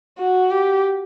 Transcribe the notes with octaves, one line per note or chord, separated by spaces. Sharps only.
F#4
G4